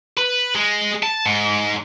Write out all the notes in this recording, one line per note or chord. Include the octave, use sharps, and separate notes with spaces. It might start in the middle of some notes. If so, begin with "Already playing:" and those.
B4
G#3
A5
G#2